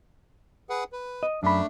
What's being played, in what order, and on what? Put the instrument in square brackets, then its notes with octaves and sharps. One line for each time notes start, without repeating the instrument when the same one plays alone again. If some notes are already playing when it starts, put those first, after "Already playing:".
[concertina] G#4 B4 F#5
B4
[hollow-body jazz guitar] D#5
[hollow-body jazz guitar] F#2 B5 [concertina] A3 D4